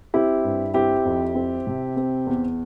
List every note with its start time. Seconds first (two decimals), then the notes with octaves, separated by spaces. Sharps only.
0.14 C4 E4 G4
0.44 G2
0.74 C4 E4 G4
1.05 F2
1.35 C4
1.67 C3
1.96 C4
2.27 E2